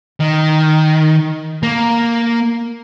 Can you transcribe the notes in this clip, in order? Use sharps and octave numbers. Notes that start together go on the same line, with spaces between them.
D#3
A#3